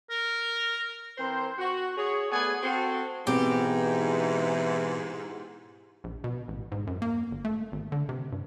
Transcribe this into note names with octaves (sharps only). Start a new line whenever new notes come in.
A#4
E3 C4 A#4 C5
F#4
F#4 G#4 C#5
A3 B3 G#4 D5 F#5 G#5
C4 F#4 A4
G#2 B2 E3 C4 G4
A#1
B2
A1
G#2
F#2
A#3
G1
A3
G#1
D3
C3
G2